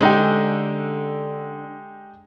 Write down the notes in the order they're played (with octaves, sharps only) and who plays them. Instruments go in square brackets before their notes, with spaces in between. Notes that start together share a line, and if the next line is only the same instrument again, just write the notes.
[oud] D3 C#4 [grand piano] G#3 D#4 G4